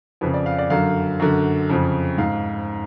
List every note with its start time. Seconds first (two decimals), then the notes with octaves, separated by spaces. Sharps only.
0.21 F2 C#3 B4
0.34 D5
0.46 F5
0.58 D5
0.70 F#2 D3 F5
1.19 F#2 D3
1.69 F2 C#3
2.18 G#2 F5